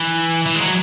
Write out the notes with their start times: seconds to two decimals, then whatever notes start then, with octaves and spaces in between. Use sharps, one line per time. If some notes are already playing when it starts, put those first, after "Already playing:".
Already playing: E3
0.46 E3
0.55 G#3
0.60 F#3